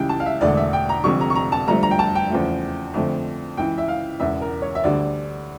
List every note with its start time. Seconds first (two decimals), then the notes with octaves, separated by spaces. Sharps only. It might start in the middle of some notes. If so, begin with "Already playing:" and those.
Already playing: C#2 C#3 E3 G3 G5
0.09 A5
0.20 F5
0.26 E5
0.41 E1 E2 D3 A3 D5
0.57 E5
0.73 G5
0.89 A#5
1.04 F1 F2 D3 G3 C#6
1.21 A#5
1.30 C#6
1.36 A#5
1.52 A5
1.68 G1 G2 F3 A3 A#5
1.83 A#5
1.91 G5
1.99 A5
2.15 G5
2.30 E2 C#3 F3 A3
2.94 F2 D3 F3 A3
3.57 C#2 C#3 E3 G5
3.78 E5
3.88 F5
4.20 E1 E2 C#3 E5
4.41 A#4
4.62 C#5
4.75 E5
4.84 D2 D3 G3 D5